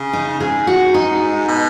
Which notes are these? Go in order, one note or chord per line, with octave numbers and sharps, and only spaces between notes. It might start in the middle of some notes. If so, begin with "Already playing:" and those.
Already playing: C#3
D#4
G#2 G#4
F#4
D#4
B2